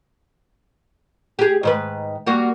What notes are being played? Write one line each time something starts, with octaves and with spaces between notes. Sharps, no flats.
G4 G#4
G#2 D#3 B4
G3 A#3 F#4